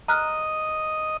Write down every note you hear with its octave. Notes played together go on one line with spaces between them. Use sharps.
D#5 A#5 F6 F#6